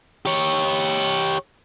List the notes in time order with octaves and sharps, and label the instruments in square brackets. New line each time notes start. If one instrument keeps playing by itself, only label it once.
[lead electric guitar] G4 C#5